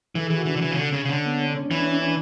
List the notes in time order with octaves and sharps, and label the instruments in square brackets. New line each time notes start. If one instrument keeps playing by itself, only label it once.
[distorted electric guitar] E3 [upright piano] A4
[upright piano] G#4
[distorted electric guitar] E3
[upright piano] F#4
[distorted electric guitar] E3 [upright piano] D4
[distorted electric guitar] D3
E3
C#3
D3
C#3
C#3
[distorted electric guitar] D3 [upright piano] C#4
[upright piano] B3
C#4
D4
C#4
D4
[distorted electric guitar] E3 [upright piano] C#4
[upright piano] D4
C#4
D4
C#4
D4